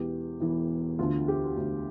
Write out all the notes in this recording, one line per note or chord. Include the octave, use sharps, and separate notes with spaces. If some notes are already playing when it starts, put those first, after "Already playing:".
Already playing: E1 E2 E3 G4
E1 E2 E3
D2 D3 F4
G4
D2 D3